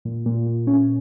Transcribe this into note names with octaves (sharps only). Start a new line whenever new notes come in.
A#2
A#2
A#2
C#4